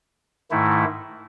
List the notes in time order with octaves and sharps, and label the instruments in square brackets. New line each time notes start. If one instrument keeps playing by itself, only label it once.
[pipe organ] G#2 D#3 A3 E4